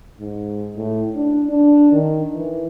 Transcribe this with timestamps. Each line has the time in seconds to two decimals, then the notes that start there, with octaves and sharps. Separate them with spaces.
0.20 G#2
0.77 A2
1.16 D4
1.50 D4
1.92 D#3
2.35 E3